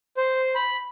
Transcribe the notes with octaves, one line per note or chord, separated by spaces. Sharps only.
C5
B5